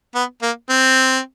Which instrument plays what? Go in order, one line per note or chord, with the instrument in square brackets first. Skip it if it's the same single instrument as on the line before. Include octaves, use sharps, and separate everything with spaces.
[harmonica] B3
A#3
C4